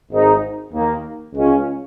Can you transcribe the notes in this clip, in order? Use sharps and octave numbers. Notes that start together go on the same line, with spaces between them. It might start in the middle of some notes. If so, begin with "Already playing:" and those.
G#1 G#2 G#3 D#4
D#2 D#3 A#3
C#2 C#3 G#3 C#4 F4